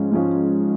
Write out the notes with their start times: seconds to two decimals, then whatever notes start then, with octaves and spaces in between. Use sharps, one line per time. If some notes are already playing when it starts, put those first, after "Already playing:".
Already playing: G#2 F3 G#3 C#4 F4
0.11 G#2 F3 G#3 C#4 F4